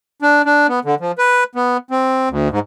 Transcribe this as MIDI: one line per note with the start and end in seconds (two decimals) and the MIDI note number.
0.22 0.42 62
0.45 0.67 62
0.68 0.80 59
0.85 0.95 50
1.00 1.12 53
1.18 1.44 71
1.55 1.77 59
1.91 2.29 60
2.30 2.48 38
2.51 2.59 44